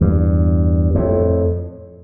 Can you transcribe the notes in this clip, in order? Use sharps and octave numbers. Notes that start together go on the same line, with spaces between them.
E2 G2
F2 A2